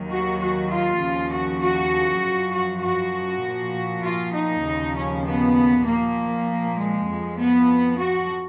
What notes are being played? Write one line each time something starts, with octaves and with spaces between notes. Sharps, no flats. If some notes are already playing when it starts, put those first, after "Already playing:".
Already playing: D#2 D#3 F#3
F#4
F#4
F4
D#2 C#3 F3
F#4
F#4
F#2 F3
F#4
F#4
A#2 F3
F4
D#4
D#2 C#3 F3
C#4
B3
A#2 F3 A#3
G#3
F2 F3
B3
F#4